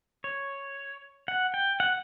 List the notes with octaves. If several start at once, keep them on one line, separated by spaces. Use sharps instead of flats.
C#5
F#5
G5
F#5